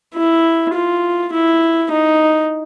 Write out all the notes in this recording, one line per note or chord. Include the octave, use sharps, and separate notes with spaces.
E4
F4
E4
D#4